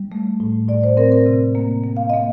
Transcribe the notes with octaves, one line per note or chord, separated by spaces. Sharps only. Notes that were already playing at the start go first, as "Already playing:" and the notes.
Already playing: G3
A3
A2
A2 D5
C5
C4 A#4
A#4
C3
A#3
A#3
F5
A#3 D#5